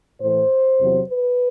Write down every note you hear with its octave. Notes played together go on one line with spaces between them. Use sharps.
A2 E3 C5
E2 C3 F#3
B4